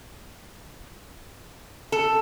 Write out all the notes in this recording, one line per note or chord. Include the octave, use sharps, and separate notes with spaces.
A4